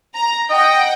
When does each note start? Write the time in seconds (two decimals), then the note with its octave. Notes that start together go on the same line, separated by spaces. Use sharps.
0.15 A#5
0.50 D#5 F#5 G5